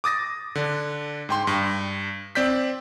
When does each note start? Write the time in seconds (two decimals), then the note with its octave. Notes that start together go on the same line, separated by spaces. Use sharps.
0.04 D6 D#6 A6 A#6
0.55 D3 D4
1.29 G#2 G5 C6
1.47 G2
2.35 C4 D5 G6 B6